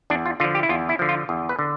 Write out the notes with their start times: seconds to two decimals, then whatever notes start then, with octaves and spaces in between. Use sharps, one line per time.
0.10 E2 D4
0.26 F4
0.40 D3 F3 F4
0.55 G4
0.63 E4
0.69 E2 F4
0.89 E4
0.99 D3 F3
1.09 F4
1.29 E2
1.49 B4
1.59 D3